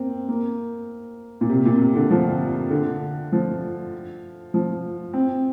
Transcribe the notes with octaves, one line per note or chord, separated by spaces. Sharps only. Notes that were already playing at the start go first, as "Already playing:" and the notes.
Already playing: A#3 C4
A#3
A#2
C3
A#2
C3
D3
F3
D3
F3
F3
C4